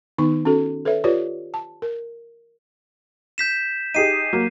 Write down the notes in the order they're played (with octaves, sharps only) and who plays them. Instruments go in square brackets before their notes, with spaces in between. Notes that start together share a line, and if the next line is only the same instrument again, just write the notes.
[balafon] D#3 B3 D#4 C#6
C#4 F#4 A4
A4 B4 C#5 E5
F4 G4 B4 C#5 D5
A5
A#4
[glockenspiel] G6 B6 E7
[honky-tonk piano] D#4 G4 G#4 [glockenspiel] C7 D#7
[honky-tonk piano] F#3 A#3